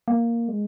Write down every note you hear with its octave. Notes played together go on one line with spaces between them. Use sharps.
A#3
G#3